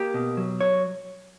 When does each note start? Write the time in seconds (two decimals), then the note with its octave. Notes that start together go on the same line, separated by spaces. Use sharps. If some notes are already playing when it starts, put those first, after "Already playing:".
Already playing: A#3 G4
0.14 B2
0.37 F#3
0.61 C#5